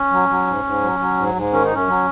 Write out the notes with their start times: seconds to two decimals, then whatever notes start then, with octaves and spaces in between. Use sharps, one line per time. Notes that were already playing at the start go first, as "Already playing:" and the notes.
Already playing: C#4
0.12 F#3
0.29 F#3
0.47 G#2
0.64 G#2
0.82 F#3
0.99 F#3
1.17 G#2
1.35 G#2
1.52 D#3 C#4
1.63 D#4
1.70 F#2 C#4
1.88 F#3